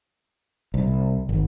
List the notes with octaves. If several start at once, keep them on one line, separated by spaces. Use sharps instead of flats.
C2
G#1